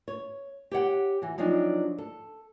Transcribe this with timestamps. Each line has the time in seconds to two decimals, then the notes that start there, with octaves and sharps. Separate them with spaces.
0.08 C#5
0.71 G4 C#5 F#5 G5
1.22 E3 F#4
1.38 F3 F#3 C4 D4 D#4
1.98 A4